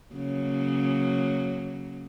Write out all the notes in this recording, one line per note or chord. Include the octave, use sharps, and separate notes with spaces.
C#3 F#3 A#3